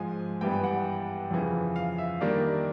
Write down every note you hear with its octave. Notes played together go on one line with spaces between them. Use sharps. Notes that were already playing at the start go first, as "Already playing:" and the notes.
Already playing: G#2 F3 G#3 G#5
G2 E3 G3 B3 G5
F#5
F2 C#3 E3
F5
E5
D#3 G3 A#3 D4